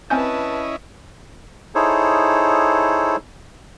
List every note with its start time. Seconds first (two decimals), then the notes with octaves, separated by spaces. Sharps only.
0.10 C4 C#4 E4 B4 D#5 G#5 A5 G6
1.75 D#4 E4 G#4 A4 C5 C#5